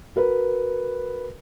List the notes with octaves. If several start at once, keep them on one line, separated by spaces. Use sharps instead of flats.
F#4 A#4 B4